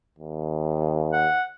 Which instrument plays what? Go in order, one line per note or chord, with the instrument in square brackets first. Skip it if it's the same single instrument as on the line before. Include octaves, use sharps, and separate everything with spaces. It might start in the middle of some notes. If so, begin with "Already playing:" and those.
[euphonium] D#2
[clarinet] F#5